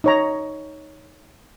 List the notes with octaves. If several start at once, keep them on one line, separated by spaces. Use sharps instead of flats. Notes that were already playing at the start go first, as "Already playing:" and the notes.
D#4 C#5 A#5